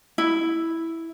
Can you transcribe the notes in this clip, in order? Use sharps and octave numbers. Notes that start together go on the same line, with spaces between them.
E4